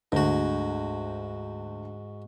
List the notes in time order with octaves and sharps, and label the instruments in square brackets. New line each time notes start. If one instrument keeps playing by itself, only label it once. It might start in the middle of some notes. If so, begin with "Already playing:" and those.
[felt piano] D2 [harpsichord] G#2 F#4